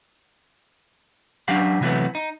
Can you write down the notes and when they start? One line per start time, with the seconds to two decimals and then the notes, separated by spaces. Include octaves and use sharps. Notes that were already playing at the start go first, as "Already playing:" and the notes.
1.48 F#3 C#4 D4 G4 F5 F#5
1.81 C3 E3 F#3 A3 B3
2.15 D#4